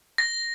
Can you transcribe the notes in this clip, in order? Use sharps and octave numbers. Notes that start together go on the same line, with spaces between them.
A#6